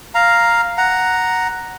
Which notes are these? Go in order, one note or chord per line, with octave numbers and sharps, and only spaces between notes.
F5 A#5
F#5 A#5